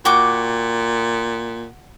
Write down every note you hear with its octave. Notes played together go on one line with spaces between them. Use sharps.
A#2 F#4 G5 D6